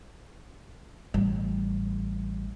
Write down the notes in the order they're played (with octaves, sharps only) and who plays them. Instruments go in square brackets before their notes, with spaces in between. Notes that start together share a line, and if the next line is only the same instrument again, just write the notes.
[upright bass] A1 G3